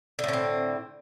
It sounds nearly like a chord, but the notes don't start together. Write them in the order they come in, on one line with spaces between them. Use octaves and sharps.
D3 A2 C#4 C4